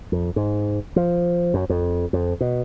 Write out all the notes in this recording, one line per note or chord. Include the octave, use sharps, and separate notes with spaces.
F2
G#2
F3
F#2
F2
F2
B2